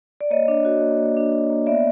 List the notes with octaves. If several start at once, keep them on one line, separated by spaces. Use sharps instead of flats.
D5
A#3 C#5 D#5
D4
F#4
A#3
A#3
D4
F#4
A#3
B3 D5 E5